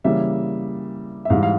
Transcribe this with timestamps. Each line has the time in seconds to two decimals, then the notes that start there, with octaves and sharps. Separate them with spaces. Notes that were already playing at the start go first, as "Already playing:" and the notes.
0.04 C#3 E3 G3 A#3 E5
1.25 E5
1.30 G#2 E3 G3 F5
1.43 F5